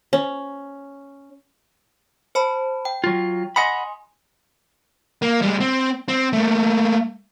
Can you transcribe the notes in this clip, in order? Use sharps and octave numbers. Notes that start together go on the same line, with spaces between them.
C#4
C5 A5 B5
G5
F#3 F4
D#5 F#5 G#5 B5 C6 D#6
A#3
G3 G#3
C4
C4
A3 A#3